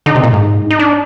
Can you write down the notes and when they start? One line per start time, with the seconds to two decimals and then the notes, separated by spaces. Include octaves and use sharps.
0.06 D3 D#4
0.15 C3
0.24 A#2
0.33 G#2
0.70 D#4
0.79 D4